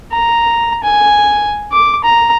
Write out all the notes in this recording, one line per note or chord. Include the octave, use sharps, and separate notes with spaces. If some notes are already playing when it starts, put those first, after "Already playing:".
A#5
G#5
D6
A#5